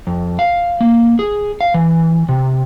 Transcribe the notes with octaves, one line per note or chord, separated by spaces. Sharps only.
F2
F5
A#3
G#4
F5
E3
C3